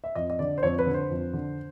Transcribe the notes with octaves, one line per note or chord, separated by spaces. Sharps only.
E5
F2 D#5
D#5
D3 D5
C5
F2 C#5
B4
D3
C5
F2
D3